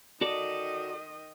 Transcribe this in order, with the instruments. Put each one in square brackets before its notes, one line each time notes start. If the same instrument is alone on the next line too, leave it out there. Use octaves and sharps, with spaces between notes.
[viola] D#3 D#5 [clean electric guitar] F#4 A4 D5